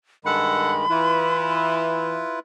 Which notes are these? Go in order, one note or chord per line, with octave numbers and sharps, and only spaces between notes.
G2 D#3 G#3 A4 F#5 B5
E3 E4 F4 B4